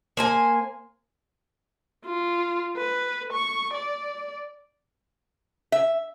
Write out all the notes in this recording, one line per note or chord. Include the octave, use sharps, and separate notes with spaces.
A#3 C5 G#5
F4
B4
C#6
D5
E5